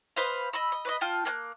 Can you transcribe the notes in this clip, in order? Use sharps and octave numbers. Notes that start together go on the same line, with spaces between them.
B4 C5 D#5 F5
D#5 B5 E6
D#5
B4 D5 D#5
F4 G5 A5
A#3 G#5 F#6